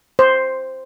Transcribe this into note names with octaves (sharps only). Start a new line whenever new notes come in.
C5